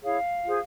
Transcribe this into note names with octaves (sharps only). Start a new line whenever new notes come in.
E4 G#4 C#5 F5
F4 G#4 C5